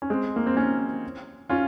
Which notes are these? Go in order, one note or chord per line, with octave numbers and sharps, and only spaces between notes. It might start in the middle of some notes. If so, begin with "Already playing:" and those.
C#4
G#3 C4
A#3
C4
A#3 C#4
C#4 F4